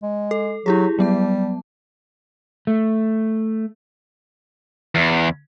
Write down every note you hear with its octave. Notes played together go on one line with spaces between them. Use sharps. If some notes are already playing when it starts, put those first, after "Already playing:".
G#3
A4
F#3 E4 G4 G#4
F#3 G3 B3 A5
A3
E2